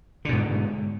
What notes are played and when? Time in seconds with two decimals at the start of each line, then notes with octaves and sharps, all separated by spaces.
0.25 D3
0.29 B2
0.33 G#2